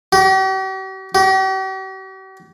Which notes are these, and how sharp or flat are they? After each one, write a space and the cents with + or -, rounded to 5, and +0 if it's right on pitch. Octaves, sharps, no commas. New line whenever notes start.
G4 -45
G4 -45